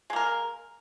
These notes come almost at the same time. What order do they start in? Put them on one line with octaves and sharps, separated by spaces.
G#3 A#3 A#4